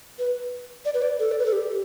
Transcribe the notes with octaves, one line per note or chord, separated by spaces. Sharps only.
B4
D5
B4
D5
A4
D5
B4
A4
G4